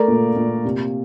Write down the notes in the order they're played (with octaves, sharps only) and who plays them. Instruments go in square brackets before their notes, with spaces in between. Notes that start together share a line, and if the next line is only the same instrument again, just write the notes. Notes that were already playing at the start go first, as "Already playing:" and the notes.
Already playing: [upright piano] A3 A#4 D5
A#2
A#2
C3